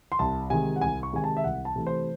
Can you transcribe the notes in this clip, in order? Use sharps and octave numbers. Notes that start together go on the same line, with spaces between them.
C6
C2 A5
C3 D#3 G#3 G#5
F#5
C2 G#5
C#6
C3 D#3 G#3 G#5
A5
E5
C2 F#5
A5
C3 E3 A3
C5